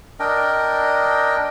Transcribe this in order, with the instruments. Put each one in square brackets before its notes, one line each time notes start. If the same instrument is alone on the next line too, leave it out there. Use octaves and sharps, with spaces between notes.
[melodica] D4 A#4 D#5 G5